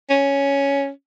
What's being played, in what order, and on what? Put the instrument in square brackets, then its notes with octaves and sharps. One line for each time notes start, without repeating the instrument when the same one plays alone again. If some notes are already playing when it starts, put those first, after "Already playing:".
[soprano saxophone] C#4